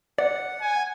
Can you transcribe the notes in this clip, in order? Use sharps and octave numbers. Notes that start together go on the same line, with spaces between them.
D5 F#5
G#5